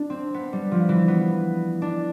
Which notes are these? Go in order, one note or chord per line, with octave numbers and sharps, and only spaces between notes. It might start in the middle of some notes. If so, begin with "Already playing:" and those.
Already playing: D4
C4
B3
G3
F3
E3
B3
D4